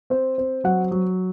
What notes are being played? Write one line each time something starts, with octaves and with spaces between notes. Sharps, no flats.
C4 C5
C4
F#3 F#5
F#3